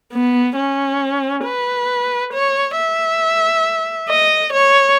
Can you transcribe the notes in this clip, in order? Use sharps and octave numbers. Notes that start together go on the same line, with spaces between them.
B3
C#4
B4
C#5
E5
D#5
C#5